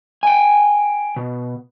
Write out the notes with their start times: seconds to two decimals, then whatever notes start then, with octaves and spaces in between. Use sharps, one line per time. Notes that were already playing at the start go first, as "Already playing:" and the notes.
0.23 G5 G#5
1.16 B2